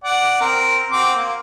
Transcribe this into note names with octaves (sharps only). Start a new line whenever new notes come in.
D5 F#5
C4 A#4
C4 F#4 D6
A#3